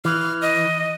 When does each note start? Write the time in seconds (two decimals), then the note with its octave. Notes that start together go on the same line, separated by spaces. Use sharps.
0.05 E3 F6
0.42 D#5